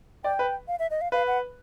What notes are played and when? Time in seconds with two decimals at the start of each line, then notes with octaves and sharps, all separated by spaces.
0.24 D5 G5
0.39 B4
0.68 F5
0.79 E5
0.90 D#5
1.01 F5
1.12 B4 F5
1.27 F#5